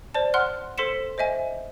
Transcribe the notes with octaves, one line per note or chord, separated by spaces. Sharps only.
C5 D5 A5
F#5 C6 F6 F#6
A4 C5 C6 B6 C#7 E7
C5 D#5 E5 G#5